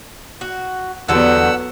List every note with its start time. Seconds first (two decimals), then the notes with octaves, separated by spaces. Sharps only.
0.41 F#4
1.09 E2 D3 F#3 G3 B3 A4 F#5 E6